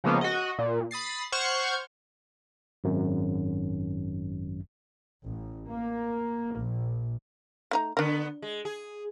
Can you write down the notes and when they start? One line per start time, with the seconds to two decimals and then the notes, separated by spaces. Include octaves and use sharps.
0.04 C#3 F3 G#3 A#3 B3 C#4
0.21 F#4 D#5
0.59 A#2
0.91 B5 D#6 A6 C7
1.32 C5 F#5 C#6 F6 G6 G#6
2.84 G#1 F#2
5.27 A1
5.70 A#3
6.59 A#1
7.71 A3 D#4 A#5
7.97 D3 B3 D4 A#4
8.42 G#3
8.65 G#4